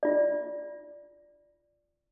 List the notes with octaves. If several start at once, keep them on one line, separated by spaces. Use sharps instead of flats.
F4 D5